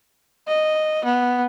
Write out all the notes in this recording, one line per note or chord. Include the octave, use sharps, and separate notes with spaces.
D#5
B3